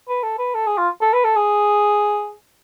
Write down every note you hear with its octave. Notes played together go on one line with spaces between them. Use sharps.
B4
A4
B4
A4
G#4
F4
A4
B4
A4
G#4